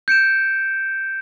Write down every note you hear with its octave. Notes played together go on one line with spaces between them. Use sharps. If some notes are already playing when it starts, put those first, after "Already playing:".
G6 C#7 D7 E7